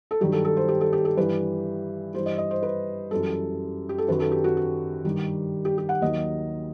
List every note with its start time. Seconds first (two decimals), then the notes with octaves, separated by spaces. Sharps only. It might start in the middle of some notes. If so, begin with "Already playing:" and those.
0.11 A4
0.21 G2 D#3 F#3 G4
0.33 A4
0.45 A4
0.57 C5
0.68 G4
0.81 A4
0.93 G4
1.05 A4
1.17 G2 E3 G3 B4
2.14 G2 E3 G3 C5
2.26 D#5
2.38 D#5
2.51 C5
2.63 B4
3.11 F#2 E3 G3 A4
3.89 G4
3.98 A4
4.08 F#2 D#3 F#3 B4
4.20 A4
4.32 G4
4.44 F#4
4.57 G4
5.05 G2 D#3 G3
5.65 G4
5.78 G4
5.89 F#5
6.01 D#2 D#3 F#3 D#5